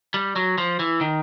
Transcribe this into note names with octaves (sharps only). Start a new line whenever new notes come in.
G3
F#3
F3
E3
D#3